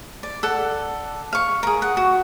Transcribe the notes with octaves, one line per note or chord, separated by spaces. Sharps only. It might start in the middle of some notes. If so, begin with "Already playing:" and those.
D5
A4 D5 F#5
F5 C#6
G#4 A#4
F#5
F#4